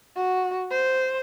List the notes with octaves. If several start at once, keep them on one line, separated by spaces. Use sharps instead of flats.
F#4
C5